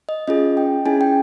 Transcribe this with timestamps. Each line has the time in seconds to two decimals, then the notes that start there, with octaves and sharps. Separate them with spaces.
0.09 D#5
0.27 C#4 F4 G#4 D#5
0.57 G5
0.86 C#4 E4 G#4 G#5
1.01 G5